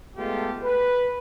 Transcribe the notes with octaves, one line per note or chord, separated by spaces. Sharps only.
G#3 A3 B3 F4 G4 A4
B4